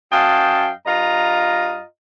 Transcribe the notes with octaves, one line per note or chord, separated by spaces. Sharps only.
F#2 D#5 F5 G5 A5
G2 F4 D#5 A#5